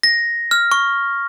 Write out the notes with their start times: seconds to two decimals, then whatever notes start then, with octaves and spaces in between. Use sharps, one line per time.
0.03 A#6
0.51 F6
0.72 C#6